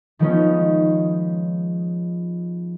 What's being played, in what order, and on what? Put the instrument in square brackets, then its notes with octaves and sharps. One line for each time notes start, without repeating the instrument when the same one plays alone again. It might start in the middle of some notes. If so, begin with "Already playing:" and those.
[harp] D#3 F3 G#3 B3 C#4 D#4